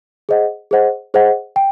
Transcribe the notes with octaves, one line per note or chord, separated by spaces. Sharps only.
G#4 C5 D#5 F#5
G#4 C5 D#5 F#5
G#4 C5 D#5 F#5
G5